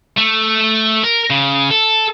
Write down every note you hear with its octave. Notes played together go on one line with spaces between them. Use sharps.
A3
A#4
C#3
A4